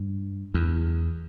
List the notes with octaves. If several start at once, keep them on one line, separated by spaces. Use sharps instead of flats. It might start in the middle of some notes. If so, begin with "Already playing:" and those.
Already playing: G2
E2